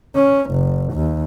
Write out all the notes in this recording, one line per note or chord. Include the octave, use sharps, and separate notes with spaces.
C#4
F#1
D#2